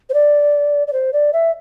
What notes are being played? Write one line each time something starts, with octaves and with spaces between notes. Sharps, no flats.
C5
D5
D5
C5
D5
E5